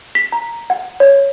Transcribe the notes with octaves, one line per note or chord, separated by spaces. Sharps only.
B6
A#5
F#5
C#5